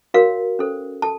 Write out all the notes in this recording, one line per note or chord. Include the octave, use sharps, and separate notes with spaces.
F#4 A#4 C#5 F5
C#4 A4 C5
A4 A5